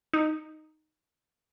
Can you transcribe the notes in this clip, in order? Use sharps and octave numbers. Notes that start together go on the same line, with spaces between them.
D#4